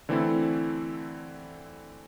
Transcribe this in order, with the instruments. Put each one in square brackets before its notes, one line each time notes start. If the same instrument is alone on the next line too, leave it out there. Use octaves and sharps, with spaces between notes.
[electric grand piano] D3 E3 A3 C4 E4 A4